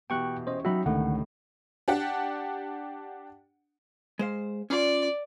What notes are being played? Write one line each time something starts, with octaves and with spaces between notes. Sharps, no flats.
B2 E3 G4 G5 C#6 F#6
C#4 C5 D#5
F#3 D#4 F#4 E5 G5 B5
C#2 A2 D3 D#3 F#5
D4 G4 F#5
G#3 C5 F5
C#4 F4 D5